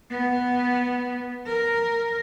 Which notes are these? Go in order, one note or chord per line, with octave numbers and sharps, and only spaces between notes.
B3
A#4